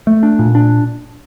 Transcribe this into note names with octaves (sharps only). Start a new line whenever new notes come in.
A3
D4
A#2
D4